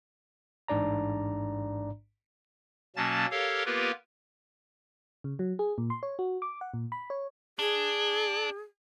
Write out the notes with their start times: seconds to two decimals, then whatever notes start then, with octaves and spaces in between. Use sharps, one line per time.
0.68 A1 G#2 D4 D5 A#5
2.96 B2 F#3 A#3 C#4 A5 A6
3.31 G4 A4 A#4 C#5 F5
3.66 A#3 B3 F4 G4 A#4 B4
5.24 C#3
5.39 F#3
5.59 G#4
5.78 A#2
5.90 C6
6.03 C#5
6.19 F#4
6.42 D6
6.61 F#5
6.74 A#2
6.92 B5
7.10 C#5
7.59 D4 G#4